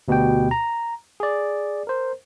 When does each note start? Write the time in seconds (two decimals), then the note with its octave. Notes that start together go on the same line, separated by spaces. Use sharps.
0.08 D2 B2 F#4 G4 G5
0.51 A#5
1.20 G#4 D5
1.87 A#4 C5